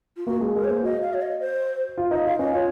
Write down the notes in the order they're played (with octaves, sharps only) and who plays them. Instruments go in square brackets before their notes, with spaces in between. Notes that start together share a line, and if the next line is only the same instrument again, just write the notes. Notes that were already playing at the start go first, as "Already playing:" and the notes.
[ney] F4
[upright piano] A#3 [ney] F#4
[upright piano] G#3
[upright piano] G#3 [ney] A#4
[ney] C#5
[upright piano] A#3 [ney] C5
[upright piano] F#4 [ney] D#5
[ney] F5
C#5
D#5
C5
[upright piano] F4
[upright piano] D#4 [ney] D#5
[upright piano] F4 [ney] F5
[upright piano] C#4 [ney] D#5
[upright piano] F4 [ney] C#5